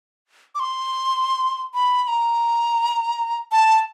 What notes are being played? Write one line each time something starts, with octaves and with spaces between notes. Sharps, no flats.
D6
C6
B5
B5
A#5
A5